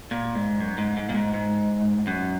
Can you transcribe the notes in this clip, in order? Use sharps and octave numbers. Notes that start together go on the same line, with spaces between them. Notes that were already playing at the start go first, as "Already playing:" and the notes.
A#2
G#2
F#2
G#2
G#2
A#2
G#2
G#2
F#2